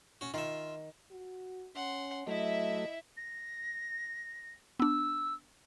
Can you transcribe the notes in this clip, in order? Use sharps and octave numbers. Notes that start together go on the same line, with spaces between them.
C#4 F#4
D#3 F4 E5
F#4
C#4 F#5 C6
F#3 A3 E4 D#5 E5
A#6
B3 D4 E6